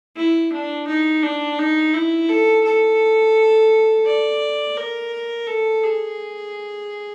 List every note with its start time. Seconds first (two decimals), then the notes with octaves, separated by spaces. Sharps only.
0.17 E4
0.53 D4
0.88 D#4
1.23 D4
1.59 D#4
1.94 E4
2.29 A4
2.65 A4
4.06 D5
4.77 A#4
5.47 A4
5.83 G#4